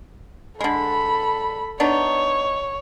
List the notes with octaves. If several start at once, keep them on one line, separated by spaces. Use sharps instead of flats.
D3 G#3 A4 B5
B3 D4 D#4 C#5